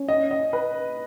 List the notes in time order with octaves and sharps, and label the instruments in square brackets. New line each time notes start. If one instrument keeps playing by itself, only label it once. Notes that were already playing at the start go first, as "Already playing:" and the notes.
Already playing: [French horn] C#4
[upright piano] D#5
D#5
B4